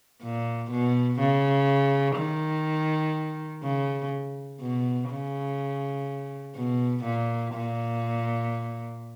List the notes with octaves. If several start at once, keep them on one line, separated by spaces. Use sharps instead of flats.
A#2
B2
C#3
D#3
C#3
B2
C#3
B2
A#2
A#2